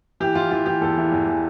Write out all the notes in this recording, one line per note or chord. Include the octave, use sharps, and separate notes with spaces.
E3 G4
E3 F4
E3 F4
E3 G4
E2 A4
E3
E2
E3